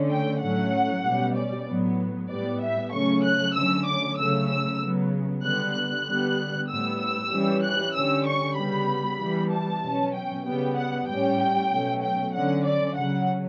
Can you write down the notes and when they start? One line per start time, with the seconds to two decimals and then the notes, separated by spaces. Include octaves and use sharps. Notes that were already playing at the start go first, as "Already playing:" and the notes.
Already playing: D3 A3 C#4
0.10 G5
0.41 A2 F#3 A3 C#4 F#5
1.04 B2 G3 C#4
1.36 D5
1.67 A2 F#3 B3
2.29 A2 G3 B3 D5
2.61 E5
2.92 C#3 F#3 A3 C#4 C#6
3.24 F#6
3.55 D3 F#3 A3 C#4 E6
3.86 D6
4.18 C#3 F#3 A3 C#4 E6
4.49 E6
4.81 C#3 F#3 B3
5.43 D3 G3 B3 F#6
5.75 F#6
6.06 D3 G3 B3
6.69 A2 G3 B3 E6
7.00 E6
7.32 E3 G3 C#4
7.63 F#6
7.95 D3 G3 C#4 E6
8.26 C#6
8.58 C#3 G3 B3 B5
9.20 E3 G3 B3
9.51 A5
9.83 B2 F#3 C#4
10.14 G5
10.45 C#3 G3 B3 G5
10.77 F#5
11.08 A2 G3 C#4 G5
11.71 B2 F#3 A3 C#4
12.02 G5
12.33 D3 F#3 C#4 F#5
12.64 D5
12.96 C#3 F#3 C#4 F#5